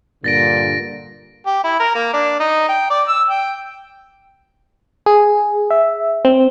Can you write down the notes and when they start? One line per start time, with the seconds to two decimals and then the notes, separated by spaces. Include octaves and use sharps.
0.24 G2 A#2 D3 A6 A#6 D7
1.46 G4
1.64 E4
1.80 A#4
1.95 A#3
2.14 D4
2.40 D#4
2.69 G5
2.90 D5
3.08 E6
3.29 G5
5.06 G#4
5.71 E5
6.25 C4